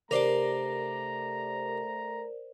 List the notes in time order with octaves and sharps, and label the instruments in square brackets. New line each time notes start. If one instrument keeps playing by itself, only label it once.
[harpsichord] C3 D4 G4 [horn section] A3 A#5 [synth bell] A#4 C5 D5